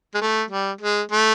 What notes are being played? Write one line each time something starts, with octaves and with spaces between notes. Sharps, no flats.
G#3
A3
G3
G#3
A3